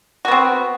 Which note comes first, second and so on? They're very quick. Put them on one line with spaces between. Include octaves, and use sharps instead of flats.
F#4 B3 C4